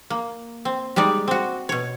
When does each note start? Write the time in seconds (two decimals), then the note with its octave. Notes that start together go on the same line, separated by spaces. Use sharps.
0.10 A#3
0.65 C4
0.96 G3 G#3 D#4 D5
1.28 C4 F#4
1.69 B2 C#5